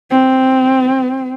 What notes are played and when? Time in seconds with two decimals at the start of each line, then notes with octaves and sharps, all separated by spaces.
0.11 C4